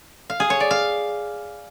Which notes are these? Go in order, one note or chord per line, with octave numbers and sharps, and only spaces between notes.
F5
G#4
C#5
D5
F5